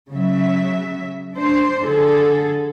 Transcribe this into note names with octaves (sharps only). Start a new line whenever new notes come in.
C#3 F#3 E5
D4 C5
D3 G#4 A4